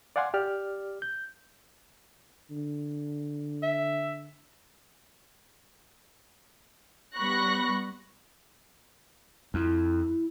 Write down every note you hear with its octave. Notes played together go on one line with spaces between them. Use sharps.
D5 F5 F#5 G#5 C6
G4 D5 F6
G6
D3
E5
G3 B3 B5 C#6 F#6 A#6
F2 E4